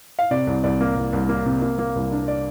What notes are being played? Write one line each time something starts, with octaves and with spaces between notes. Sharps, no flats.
F5
C3 D5
C2
C2 D5
A#3
C2
C2
A#3
C3
A#3
A#3
C2
D4
D5